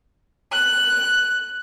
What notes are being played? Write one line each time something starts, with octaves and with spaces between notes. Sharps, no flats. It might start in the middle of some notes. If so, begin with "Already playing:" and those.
F#6